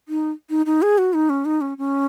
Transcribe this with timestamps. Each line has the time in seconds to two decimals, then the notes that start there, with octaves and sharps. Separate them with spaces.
0.08 D#4
0.50 D#4
0.66 D#4
0.82 G#4
0.98 F#4
1.14 D#4
1.30 C#4
1.45 D#4
1.61 C#4
1.78 C#4